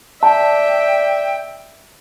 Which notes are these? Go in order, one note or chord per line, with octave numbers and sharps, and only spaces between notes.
D5 E5 G5 A5